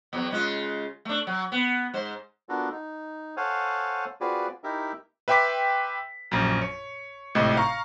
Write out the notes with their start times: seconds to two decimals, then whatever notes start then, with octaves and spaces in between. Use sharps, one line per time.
0.13 E2 F#3
0.31 C#3 G#3 F4
1.05 A3 D4
1.27 F#3
1.52 B3
1.94 G#2 C5
2.49 B3 D4 F4 F#4 A4 A#4
2.71 D#4
3.37 A4 C5 C#5 F5 F#5 G#5
4.21 C4 F4 F#4 G#4 B4 D5
4.64 D#4 E4 G4 A#4 E5
5.28 B4 E5 G5 C6 D6 B6
6.31 A#1 F#2
6.61 C#5
7.35 G#1 A2 C3 D#5
7.57 F5 A#5 C#6